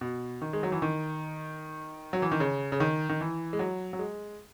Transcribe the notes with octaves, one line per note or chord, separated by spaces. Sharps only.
B2
D#3
G#3
F#3
E3
D#3
F#3
E3
D#3
C#3
C#3
D#3
D#3
E3
G#3
F#3
F#3
G#3